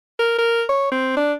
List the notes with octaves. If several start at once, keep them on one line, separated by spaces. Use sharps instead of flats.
A#4
A#4
C#5
C4
D4